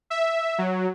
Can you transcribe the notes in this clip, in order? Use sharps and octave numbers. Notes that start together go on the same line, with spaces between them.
E5
F#3